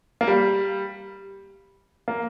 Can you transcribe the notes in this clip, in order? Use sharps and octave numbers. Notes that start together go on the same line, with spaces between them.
A#3
G3
A#3